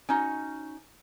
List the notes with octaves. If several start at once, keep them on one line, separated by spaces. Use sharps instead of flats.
C#4 D#4 F#4